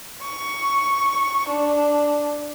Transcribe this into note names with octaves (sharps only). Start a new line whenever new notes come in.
C#6
D4